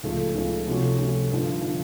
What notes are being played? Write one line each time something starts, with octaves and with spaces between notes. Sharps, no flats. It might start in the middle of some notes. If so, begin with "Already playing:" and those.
C#2 C#3 F3 A3
C#2 C#3 F3 A3
C3 F3 A3 C#4 F#4
C3 F3 A3 C#4 F#4
G2 D3 F3
D3 F3